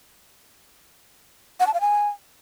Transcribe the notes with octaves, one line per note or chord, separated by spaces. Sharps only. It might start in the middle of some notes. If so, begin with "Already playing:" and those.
F#5
A5
F5
G#5